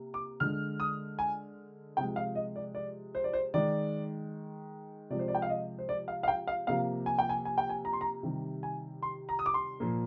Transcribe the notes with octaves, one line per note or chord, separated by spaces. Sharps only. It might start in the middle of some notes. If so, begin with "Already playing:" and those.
Already playing: C3 A#3
D6
D3 G#3 F6
D#6
G#5
C3 F3 G#3 G5
F5
D#5
D5
D5
C5
D5
C5
D#3 G#3 D5
C3 F3 G#3 D5
C5
D5
G5
F5
D#5
C5
D5
F5
F5
G5
F5
C3 F3 A#3 F5
G#5
G5
G#5
G#5
G5
G#5
A#5
C6
A#5
C3 D#3 G3
G#5
C6
A#5
D#6
D6
C6
A#2 F3 A#3